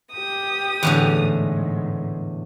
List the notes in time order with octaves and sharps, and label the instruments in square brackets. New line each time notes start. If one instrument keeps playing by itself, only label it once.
[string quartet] G4 D#6
[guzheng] E2 A2 D3
[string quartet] G#2